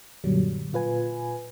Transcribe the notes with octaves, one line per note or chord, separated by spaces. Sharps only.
F#2 A#2 D3 F#3 G3
A#2 F4 B4 G#5